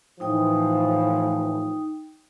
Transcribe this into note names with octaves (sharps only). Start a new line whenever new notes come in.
A2 E3 F3 D#4 G5 D#6